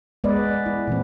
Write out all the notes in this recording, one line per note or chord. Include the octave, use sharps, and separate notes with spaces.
G#3 B3 B4 D5 D#5
E4
A#2 E3 C4